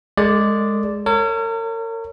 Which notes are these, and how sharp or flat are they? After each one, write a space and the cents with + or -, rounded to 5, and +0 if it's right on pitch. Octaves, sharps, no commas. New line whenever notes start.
G#3 +0 A4 +40 D5 +0
A#4 -40 C#5 +0